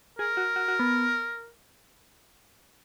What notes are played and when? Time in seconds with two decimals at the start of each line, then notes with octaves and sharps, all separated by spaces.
0.19 G#4 A#4
0.37 F#4
0.56 F#4
0.68 F#4
0.79 B3